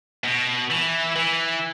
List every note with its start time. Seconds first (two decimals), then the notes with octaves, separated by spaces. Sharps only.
0.24 B2
0.71 E3
1.16 E3